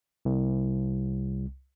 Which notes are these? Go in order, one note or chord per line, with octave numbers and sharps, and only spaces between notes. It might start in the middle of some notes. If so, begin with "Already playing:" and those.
C2